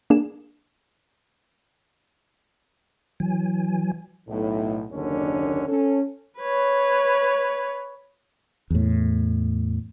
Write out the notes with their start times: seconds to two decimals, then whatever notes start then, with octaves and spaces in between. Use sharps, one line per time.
0.10 A#3 D4 G#4 E7
3.20 E3 F#3 G#5
4.28 B1 A2
4.92 F#1 D#2 D3 C#4 D4
5.68 C#4 A4
6.40 B4 C#5
8.70 E2 A2